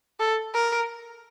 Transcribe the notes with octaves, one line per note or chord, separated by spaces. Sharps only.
A4
A#4